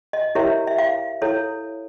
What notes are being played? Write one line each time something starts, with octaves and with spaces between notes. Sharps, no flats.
D#5
E4 G4 A#4 C#5 E5
E5
F5
E4 A4 C#5